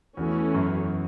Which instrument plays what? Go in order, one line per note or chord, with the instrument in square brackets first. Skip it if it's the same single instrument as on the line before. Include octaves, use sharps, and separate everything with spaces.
[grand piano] E2 [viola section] E3 A3 C#4 F#4
[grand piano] F#2